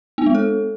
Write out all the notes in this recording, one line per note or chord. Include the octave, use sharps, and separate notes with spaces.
B3
G#3
A4